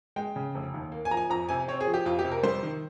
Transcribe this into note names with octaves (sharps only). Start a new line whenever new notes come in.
G#3 G5
C#3
F1
D#2
A#3
G#5
F3 A#5
G#5
F2 A#5
C3 G#5
C4 C#5
G#4
F3
G4
F2 F4
G4
C3
A#4
G3 C5
D#3